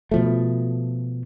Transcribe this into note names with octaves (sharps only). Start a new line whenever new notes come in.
B2 F3 A3